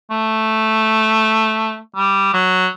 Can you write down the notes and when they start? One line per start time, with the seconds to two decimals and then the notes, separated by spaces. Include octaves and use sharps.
0.11 A3
1.96 G3
2.34 F#3